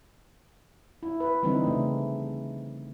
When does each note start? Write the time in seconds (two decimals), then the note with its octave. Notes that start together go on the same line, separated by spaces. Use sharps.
1.03 E4
1.20 B4
1.43 D3 E3 G3 C4 D#4
1.64 C#3 A3